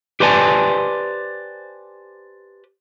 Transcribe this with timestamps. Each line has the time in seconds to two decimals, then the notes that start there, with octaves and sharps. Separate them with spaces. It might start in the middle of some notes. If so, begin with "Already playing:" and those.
0.20 G4 B4 C5 D5 G#5 A5